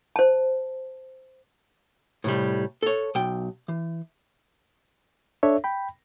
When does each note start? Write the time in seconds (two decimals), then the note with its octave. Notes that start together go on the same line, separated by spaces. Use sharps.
0.16 C5 A5
2.24 A2 C3 G3
2.83 A4 C#5
3.15 B1 G5
3.68 E3
5.43 D4 A4 C#5 E5
5.64 G5 B5